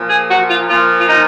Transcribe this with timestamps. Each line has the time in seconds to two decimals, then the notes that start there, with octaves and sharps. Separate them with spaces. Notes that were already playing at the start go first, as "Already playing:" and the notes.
Already playing: A#2 F3
0.09 G#4
0.29 F#4
0.48 F4
0.68 A#2 F3 F4
1.00 F4
1.08 D#4